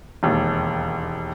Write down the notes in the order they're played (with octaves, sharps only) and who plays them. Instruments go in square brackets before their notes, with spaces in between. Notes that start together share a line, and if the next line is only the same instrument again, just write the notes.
[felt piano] E1 D#2